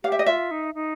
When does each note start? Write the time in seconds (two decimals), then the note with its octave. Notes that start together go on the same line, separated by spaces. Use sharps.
0.04 G4 F5
0.12 E5
0.19 D#5
0.26 F4 E5
0.51 D#4
0.75 D#4